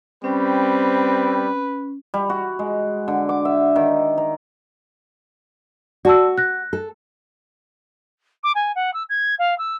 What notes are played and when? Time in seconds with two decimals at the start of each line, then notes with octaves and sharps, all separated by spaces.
0.24 G3 C4 C#4 B4
2.14 G3
2.30 F#4
2.59 G#3
3.08 D3
3.29 D6
3.45 E5
3.76 D#3
4.18 A#5
6.05 F#4 D5 A5 E6
6.38 F#6 A#6
6.73 A4
8.43 D6
8.55 G#5
8.75 F#5
8.94 E6
9.09 G#6
9.39 F5
9.58 E6